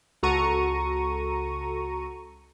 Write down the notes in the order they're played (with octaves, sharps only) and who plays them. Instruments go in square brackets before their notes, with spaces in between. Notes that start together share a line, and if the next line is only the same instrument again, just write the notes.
[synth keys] C#2 F#4 A4 A#5 C#6 D#7